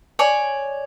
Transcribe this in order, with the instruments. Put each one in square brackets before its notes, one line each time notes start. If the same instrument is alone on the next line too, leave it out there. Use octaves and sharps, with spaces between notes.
[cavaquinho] C#5 D5 G#5